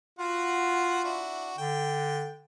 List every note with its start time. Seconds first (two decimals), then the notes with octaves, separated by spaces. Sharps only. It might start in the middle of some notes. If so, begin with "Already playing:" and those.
0.19 F4 F#4 F#5
1.04 D4 E4 F#4
1.58 D3 G5